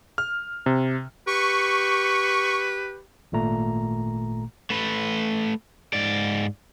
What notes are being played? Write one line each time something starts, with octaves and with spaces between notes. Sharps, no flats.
F6
C3
G4 B4 C#6
G#1 A#2 A3 A#5
A3 B4
G#2 D5